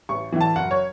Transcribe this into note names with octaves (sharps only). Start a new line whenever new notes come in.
A1 C#6
A2 E3
A5
F#1 F#5
C#5